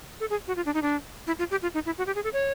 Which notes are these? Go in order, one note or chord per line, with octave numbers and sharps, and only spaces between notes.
A4
G#4
F#4
F4
D4
D#4
D4
E4
F4
G4
F4
D#4
E4
F#4
G4
G#4
A4
C#5